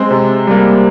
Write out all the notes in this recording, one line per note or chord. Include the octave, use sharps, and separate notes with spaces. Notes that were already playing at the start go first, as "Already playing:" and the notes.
Already playing: G#3 C4
C3
G3 A#3